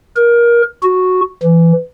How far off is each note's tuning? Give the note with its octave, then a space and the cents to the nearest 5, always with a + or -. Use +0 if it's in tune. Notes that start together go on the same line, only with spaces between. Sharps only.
A#4 +20
F#4 -5
E3 +20